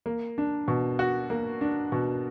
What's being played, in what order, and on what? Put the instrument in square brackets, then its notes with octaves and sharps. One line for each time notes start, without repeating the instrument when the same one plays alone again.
[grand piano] A#3
D4
B2
F#4
A#3
D4
B2